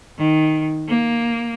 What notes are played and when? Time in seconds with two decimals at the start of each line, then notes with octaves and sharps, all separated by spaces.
0.18 D#3
0.87 A#3